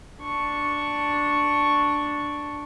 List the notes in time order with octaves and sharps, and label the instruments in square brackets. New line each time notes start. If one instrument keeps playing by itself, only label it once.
[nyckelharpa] D4 C#6